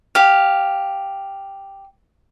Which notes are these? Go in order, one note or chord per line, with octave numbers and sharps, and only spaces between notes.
G4 F5